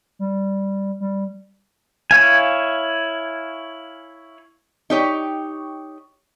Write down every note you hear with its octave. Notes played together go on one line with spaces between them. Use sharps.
G3
G3
E4 C#5 F5 G#5
D#4 G4 C#5